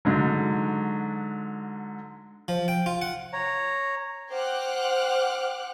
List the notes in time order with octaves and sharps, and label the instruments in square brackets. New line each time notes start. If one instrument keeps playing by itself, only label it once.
[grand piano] G#2 D3 F#3
[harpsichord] F3
G5
F4
F#5
[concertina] C#5 A#5
[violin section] C5 F#5 G5 D6 F6 F#6